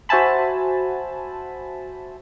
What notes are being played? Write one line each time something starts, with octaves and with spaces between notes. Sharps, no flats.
F#4 C5 E5 G#5 A5 B5